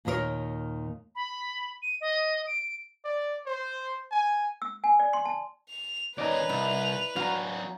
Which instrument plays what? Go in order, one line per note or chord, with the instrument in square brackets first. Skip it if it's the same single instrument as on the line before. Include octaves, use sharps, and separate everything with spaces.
[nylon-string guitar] D#2 A#2 D#3 D#4 A#4 C#5
[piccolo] B5
D#7
D#5
D7
[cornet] D5
C5
G#5
[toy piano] E6
G#5
D5
C6
A5
[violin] F7
[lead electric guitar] D#2 C#4 [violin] B4 F7 [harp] D5 D#5 A#5
[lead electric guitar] C2 [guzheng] E4
[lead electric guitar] F#3 D4 [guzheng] F#4 [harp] F5 A#5